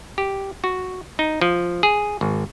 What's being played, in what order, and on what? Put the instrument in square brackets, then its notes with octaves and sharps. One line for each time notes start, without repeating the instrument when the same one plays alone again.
[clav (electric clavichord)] G4
F#4
D#4
F3
G#4
G#1